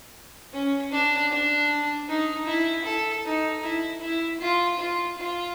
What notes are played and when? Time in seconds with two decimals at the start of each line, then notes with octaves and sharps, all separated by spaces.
0.54 C#4
0.92 D4
1.31 D4
2.09 D#4
2.47 E4
2.85 A4
3.25 D#4
3.63 E4
4.01 E4
4.40 F4
4.79 F4
5.18 F4